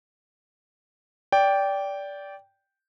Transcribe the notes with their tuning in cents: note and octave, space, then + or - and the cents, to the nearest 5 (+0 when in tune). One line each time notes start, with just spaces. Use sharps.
D5 -20 G5 +0